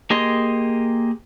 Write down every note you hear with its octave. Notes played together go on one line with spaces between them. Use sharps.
A#3 G4 G#4 D#5 C6